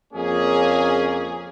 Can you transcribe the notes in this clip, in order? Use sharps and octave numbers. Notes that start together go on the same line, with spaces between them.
F2 C#3 A#3 C#4 G#4